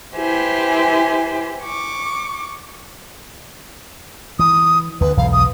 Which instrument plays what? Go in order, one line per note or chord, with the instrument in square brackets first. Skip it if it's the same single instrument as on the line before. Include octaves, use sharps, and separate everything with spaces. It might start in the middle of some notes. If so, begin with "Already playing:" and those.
[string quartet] E4 G4 B4 C5 G#5
C#6 D6
[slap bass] E3 [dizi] D#6
[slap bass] D2 D3 [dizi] B4
[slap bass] B1 E2 G#2 [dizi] F5
[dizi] D#6